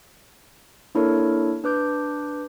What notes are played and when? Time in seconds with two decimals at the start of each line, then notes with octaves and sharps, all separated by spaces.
0.95 A#3 D4 E4 A4 A#4 C#5
1.64 D4 B4 D6 G6